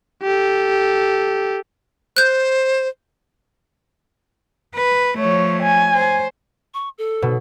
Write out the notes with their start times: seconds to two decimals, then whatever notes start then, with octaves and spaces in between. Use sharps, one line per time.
0.23 G4 A4
2.17 C5 F#6 G6
4.75 B4
5.18 F3 A3 C#5
5.63 G#5
5.93 C5
6.74 C#6
6.98 A4
7.22 B2